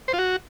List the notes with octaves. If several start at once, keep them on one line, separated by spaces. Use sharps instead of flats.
C5
F4
F#4